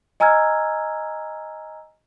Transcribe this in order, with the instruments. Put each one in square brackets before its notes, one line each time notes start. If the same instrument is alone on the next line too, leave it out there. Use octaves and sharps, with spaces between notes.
[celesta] D#5 G#5 A#5 E6 F6 G#6